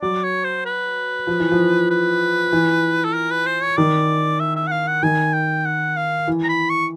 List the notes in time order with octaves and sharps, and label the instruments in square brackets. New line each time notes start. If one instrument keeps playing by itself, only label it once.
[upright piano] F#3 [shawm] D5
[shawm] C#5
C5
B4
[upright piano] F3
E3
F3
[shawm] B4
[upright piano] E3
[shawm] A4
A#4
B4
C5
C#5
[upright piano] D#3 [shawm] D5
[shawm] E5
E5
F#5
F5
F#5
[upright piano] D#3 [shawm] G#5
[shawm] G5
F#5
F5
[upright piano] E3
[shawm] A#5
B5
C#6